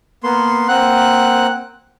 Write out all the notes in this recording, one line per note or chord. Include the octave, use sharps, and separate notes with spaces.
A#3 B3 C6
A#3 C4 F#5 F#6